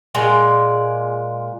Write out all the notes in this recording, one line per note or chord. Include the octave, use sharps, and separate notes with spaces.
A#2 G#3 D5